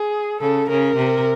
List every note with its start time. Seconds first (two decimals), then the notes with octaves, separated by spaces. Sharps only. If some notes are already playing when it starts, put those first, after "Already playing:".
Already playing: G#4
0.41 C#3 A4
0.69 C#3 A#4
0.97 C3